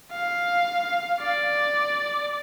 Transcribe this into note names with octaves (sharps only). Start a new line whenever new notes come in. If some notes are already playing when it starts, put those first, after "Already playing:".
F5
D5